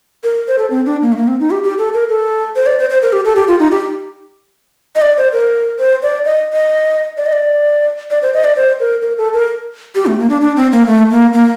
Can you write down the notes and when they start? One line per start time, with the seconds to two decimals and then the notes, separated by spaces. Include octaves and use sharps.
0.24 A#4
0.48 C5
0.58 A4
0.70 C4
0.86 D4
1.02 A#3
1.12 A3
1.17 A#3
1.28 C4
1.40 D#4
1.51 G4
1.63 G4
1.78 A4
1.94 A#4
2.10 A4
2.56 C5
2.66 D5
2.79 C5
2.90 C5
3.02 A#4
3.13 G4
3.25 A4
3.36 G4
3.48 F4
3.60 D#4
3.71 G4
4.96 D#5
5.02 D5
5.18 C5
5.33 A#4
5.79 C5
6.03 D5
6.25 D#5
6.53 D#5
7.17 D5
7.26 D#5
7.33 D5
8.11 D5
8.22 C5
8.34 D#5
8.44 D5
8.56 C5
8.80 A#4
9.02 A#4
9.18 A4
9.33 A#4
9.95 G4
10.06 A3
10.19 A#3
10.30 D4
10.41 D4
10.56 C4
10.72 A#3
10.87 A3
11.11 A#3
11.33 A#3